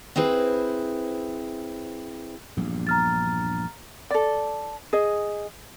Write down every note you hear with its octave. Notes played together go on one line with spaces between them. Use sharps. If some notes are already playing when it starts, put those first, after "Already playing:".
C4 E4 G#4 B4 C5
A#1 E2 G2
A#5 F6 A6
A4 D5
G#4 D#5